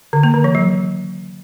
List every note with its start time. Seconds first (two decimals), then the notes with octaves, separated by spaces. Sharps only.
0.13 D3
0.23 A#3
0.34 D#3
0.44 E3
0.55 F#3